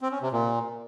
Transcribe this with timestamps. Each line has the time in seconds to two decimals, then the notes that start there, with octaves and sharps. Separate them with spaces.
0.01 C4
0.11 C#4
0.22 C3
0.32 A#2